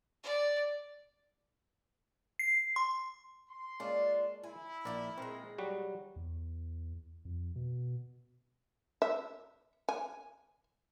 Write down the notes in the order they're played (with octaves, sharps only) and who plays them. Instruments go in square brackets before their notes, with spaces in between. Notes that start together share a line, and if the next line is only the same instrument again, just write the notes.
[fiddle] D5
[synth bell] C7
C6
[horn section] C6
[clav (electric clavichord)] G#3 A#3 C#4 [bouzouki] D4 F4
[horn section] E4 [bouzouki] G#5
[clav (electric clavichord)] A#1 A#4 D5 [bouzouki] E5 F5 G5
[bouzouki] A#2 G#3 [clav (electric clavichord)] C4 A#4
[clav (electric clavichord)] F#3 G3 F#4
[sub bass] E2
F2
B2
[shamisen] E5
G#5